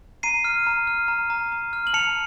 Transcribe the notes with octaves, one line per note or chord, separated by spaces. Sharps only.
A#5 C7 D#7
F6
A#5
F6
A#5
A#5
A#5
F6
F#7
A5 C#7 F7